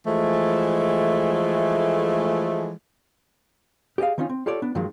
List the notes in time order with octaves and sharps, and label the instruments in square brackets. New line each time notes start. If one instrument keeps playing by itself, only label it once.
[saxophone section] E3 F3 G#3 A3
[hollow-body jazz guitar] G4 G#4 D5 D#5 F5
D#3 C4 C#4 D#4 F4
C4
F4 G4 A4 C#5 D5
B3 D4
G2 D#3 F3 F#3 G#3 A#3